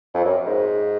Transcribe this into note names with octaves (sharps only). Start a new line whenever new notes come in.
F2
F#2
G#2